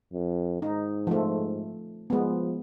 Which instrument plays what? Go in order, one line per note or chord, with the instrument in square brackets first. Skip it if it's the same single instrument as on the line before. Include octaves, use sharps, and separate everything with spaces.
[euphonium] F2
[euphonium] G#2 [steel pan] D#4
[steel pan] F3 A3
[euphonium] F3 [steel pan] G#3 B3